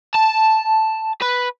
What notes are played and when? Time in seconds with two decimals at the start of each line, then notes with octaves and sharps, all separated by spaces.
0.15 A5
1.22 B4